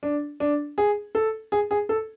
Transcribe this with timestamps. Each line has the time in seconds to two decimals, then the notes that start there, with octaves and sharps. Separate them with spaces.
0.03 D4
0.40 D4
0.78 G#4
1.15 A4
1.52 G#4
1.71 G#4
1.89 A4